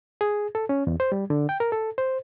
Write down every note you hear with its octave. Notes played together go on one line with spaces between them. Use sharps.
G#4
A4
C#4
E2
C5
G3
D3
G5
A#4
A4
C5